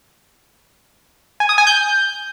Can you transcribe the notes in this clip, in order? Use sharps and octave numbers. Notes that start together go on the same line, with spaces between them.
G#5
D#6
G#5
G6